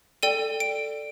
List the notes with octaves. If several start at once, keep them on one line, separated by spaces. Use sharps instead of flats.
A4 D5 G5 D#7
D7